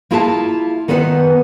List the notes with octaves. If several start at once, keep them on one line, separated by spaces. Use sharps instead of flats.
A#3 E4 F4 G#4 E5 A5
D#3 B3 B4 C5 E5 F#5